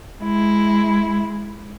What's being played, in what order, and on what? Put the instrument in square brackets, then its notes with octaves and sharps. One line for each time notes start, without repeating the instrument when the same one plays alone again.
[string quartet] G#3 E4